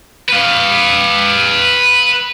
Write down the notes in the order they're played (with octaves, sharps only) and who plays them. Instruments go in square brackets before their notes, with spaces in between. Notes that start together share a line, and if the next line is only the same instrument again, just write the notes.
[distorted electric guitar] B4 F5